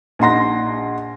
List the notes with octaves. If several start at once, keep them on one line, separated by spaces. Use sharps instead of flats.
A#1 D#4 F#5 C6 A#6